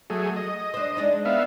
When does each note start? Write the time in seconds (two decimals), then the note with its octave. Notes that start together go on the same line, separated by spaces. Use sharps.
0.10 F#3 A3 G#4
0.36 D#5
0.74 D4 C5
0.97 G#3 D4 D#4
1.25 B3 E5 F5